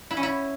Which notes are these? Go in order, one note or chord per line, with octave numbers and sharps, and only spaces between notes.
E4
C#4
E4